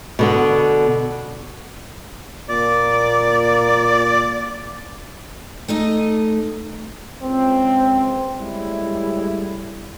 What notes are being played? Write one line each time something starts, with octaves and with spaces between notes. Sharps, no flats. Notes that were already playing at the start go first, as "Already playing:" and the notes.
B2 D3 B3
A#2 D5
A3 D#4 D#5
C#2 C4
A2 G3 G#3 E4